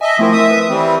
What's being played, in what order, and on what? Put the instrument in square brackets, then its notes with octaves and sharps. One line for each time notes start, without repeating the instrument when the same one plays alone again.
[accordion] D#5 E5 [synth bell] G#5 A5
[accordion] F3 C4 [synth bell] A3 E4 A#4
[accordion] E5 D#6
[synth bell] B4
[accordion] E3 G3 C4